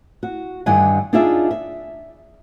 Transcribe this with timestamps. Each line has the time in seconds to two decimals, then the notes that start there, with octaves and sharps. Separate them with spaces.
0.23 F#4
0.66 G2 D3 D#3 G3 F#5 G#5
1.13 D4 D#4 F4 G#4 D5 E5
1.51 E5